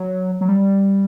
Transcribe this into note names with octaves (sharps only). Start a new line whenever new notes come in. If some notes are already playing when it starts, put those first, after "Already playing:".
Already playing: F#3
F#3
G3